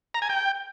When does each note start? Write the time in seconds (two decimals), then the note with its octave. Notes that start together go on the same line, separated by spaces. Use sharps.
0.14 A#5
0.22 G#5
0.29 G5